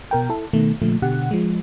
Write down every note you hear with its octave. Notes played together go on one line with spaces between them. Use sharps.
B2 A#4 G5
E4 A4
B2 D#3 A3
A#2 D3 F3 A3
B2 D3 G4 F#5
F3 G#3